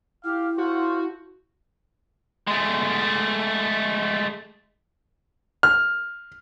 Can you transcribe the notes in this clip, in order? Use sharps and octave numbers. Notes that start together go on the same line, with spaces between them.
E4 G4 F5
A3 F4 F#4 C5
G#3 A3
F6